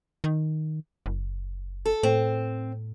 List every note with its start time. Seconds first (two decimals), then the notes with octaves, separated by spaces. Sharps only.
0.24 D#3
1.06 F#1
1.86 A4
2.03 A2 C4